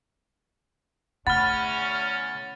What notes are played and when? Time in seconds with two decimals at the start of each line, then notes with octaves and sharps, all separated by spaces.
1.27 E2 D3 A3 C#4 F#5 B5 F6 A6